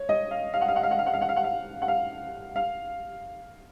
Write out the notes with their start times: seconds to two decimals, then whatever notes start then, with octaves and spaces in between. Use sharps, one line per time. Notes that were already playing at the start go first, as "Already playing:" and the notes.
Already playing: C#5
0.09 D#5
0.31 F5
0.54 F5
0.61 F#5
0.68 F5
0.76 F#5
0.83 F5
0.91 F#5
0.99 F5
1.06 F#5
1.14 F5
1.21 F#5
1.29 F5
1.36 F#5
1.44 F5
1.82 F#5
1.88 F5
2.56 F5